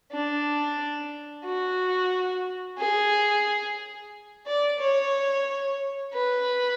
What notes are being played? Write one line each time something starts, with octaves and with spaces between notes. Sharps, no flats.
D4
F#4
G#4
D5
C#5
B4